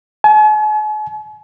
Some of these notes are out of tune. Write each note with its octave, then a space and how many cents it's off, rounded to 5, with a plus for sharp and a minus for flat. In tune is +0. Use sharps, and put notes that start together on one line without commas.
G#5 +45